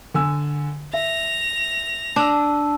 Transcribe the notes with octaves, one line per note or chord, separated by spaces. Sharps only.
D3 G#5 E6
E5 A#6 F7
D4 A5 E6